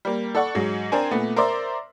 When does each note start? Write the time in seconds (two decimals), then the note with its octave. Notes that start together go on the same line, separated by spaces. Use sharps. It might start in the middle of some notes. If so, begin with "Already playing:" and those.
0.05 G3 A#3
0.35 A4 D5 F#5 C#6
0.55 G#2 F#3 G#3
0.92 C4 D4 A#4 C5 G#5
1.11 A#2 A3 B3
1.36 A#4 C5 D5 E5 C6 D6